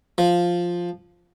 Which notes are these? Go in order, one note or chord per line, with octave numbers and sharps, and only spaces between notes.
F3